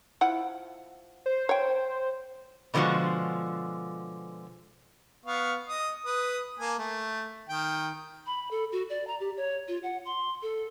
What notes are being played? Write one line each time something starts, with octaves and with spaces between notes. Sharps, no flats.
F3 E4 F#5
C5
C#5 G5
B2 D3 F3 G3 G#3 F#4
B3 F5 C#6
D#5 D#6
B4 D#6
A#3 G#5 A5
A3
D#3 G5
B5
A4
F#4
D5
A#5
G4
C#5
F4
F#5
C6
A4